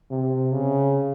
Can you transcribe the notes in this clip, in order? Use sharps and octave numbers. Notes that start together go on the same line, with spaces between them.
C3
C#3